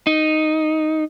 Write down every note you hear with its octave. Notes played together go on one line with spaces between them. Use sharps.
D#4